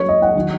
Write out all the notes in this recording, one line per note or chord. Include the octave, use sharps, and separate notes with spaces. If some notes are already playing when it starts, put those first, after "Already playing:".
Already playing: F#3 C#4 C#5
D#5
F#5
D#3 F#3 D#4